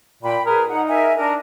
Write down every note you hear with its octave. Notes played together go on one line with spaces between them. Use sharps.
A#2 G5 B5
G#4 A#4 B4
D#4 F#5
A#4 E5 G#5
D4 A#4